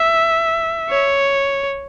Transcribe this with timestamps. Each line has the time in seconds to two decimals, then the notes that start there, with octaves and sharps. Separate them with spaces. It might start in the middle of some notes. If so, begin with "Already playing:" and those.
Already playing: E5
0.90 C#5